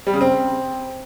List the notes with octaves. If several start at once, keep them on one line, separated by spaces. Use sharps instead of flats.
G3
C#3
C4